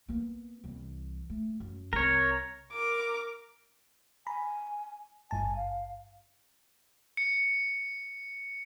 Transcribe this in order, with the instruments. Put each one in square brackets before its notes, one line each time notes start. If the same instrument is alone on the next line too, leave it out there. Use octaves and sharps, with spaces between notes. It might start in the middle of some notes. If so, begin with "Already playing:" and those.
[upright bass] A#3 B3
C2 E3
A3
F#2
[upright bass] C2 C4 [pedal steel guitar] A#4 C#5
[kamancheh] A#4 D6
[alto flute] G#5 [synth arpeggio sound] A#5 B5
[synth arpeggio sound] G#1 G2 A5 [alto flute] G#5
[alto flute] F5
[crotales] C#7